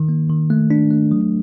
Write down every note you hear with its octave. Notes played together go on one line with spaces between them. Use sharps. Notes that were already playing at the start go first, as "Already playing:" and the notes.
Already playing: D#3
A#3
D#3
A3
D4
A3
F#3